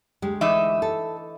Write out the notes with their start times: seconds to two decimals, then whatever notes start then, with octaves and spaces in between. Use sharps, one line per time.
0.22 D2 G#3 G4
0.41 E3 D#4 E5
0.82 A4